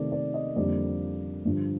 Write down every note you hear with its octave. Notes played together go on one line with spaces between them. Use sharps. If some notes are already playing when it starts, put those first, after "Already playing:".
Already playing: C3 D#3 A3 D5
D5
D#5
F2 D3 G3 A#3 D5
G2 D3 F3